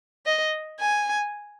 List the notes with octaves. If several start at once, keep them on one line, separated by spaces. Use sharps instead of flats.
D#5
G#5